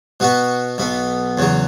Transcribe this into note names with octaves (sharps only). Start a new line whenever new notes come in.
B2 B3 F#4
B1 B2 B3
E2 C#3 F#3